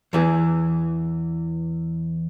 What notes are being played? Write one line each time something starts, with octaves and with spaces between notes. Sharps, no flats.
E2 E3 G#4